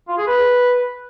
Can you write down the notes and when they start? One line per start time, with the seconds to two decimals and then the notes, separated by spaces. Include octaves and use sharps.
0.08 F4
0.18 G#4
0.27 B4